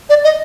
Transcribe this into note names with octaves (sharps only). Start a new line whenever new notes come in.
D5
D#5